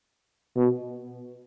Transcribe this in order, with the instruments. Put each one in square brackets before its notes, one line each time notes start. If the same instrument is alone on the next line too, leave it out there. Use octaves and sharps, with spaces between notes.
[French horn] B2